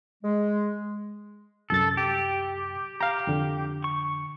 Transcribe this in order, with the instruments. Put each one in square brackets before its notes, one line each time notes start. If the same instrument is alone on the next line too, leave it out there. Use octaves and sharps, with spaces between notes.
[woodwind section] G#3
[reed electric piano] C2 F#2 A6 [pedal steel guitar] A4
[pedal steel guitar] G4
[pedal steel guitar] G4 [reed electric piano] F5 A#5
[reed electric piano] F2 D3
[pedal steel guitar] C#6